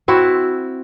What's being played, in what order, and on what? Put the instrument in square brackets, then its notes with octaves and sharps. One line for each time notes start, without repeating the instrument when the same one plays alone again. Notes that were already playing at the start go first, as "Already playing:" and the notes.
[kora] C4 E4 F#4